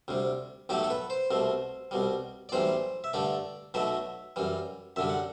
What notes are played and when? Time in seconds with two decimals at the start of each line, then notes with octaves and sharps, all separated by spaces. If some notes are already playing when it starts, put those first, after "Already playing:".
0.08 D2 C3 G3
0.69 B1 A2 F#3 A3 G4
0.83 A4
0.90 B4
1.10 C5
1.31 C2 B2 A3
1.91 C2 B2 G3
2.49 D5
2.52 B1 A2 E3 G3 C5
3.04 E5
3.13 G2 D3 A3 D5
3.74 B1 B2 F#3 A3 E5
4.36 F#2 E3 G3
4.96 F#2 D3 G3 E5
5.09 F#5